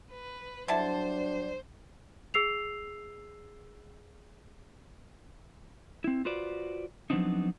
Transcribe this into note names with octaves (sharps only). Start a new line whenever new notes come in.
B4
D3 F#3 G3 D4 E4 C5 D5 A5
G#4 E6 C7 F7
C4 E4
F4 F#4 B4 C5 D5
F3 F#3 B3 C4 D4 D#4